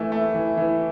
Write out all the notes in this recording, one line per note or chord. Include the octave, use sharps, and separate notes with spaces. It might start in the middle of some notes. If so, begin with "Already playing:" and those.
Already playing: E3 A3 E4
A3
E3
E3